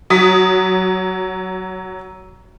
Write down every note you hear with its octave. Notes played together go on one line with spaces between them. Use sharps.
F#3 D#6 B6